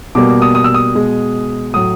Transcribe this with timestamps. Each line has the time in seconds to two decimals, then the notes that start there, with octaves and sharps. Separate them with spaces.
0.15 B2 G3 A#3 D6
0.28 D6
0.42 D#6
0.55 D#6
0.64 E6
0.74 D#6
0.95 B2 G#3
1.74 A2 F#3 A3 D#6